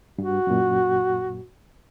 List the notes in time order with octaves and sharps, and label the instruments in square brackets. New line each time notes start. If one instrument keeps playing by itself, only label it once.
[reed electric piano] G2 [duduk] F#4
[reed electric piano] F#2 A#2